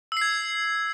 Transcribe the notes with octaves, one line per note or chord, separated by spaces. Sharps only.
E6 G#6 C7